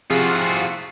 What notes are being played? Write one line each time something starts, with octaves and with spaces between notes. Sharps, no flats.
C3 F3 F4 F#4 G#4